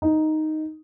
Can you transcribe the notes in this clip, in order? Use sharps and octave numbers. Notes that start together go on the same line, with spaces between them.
D#4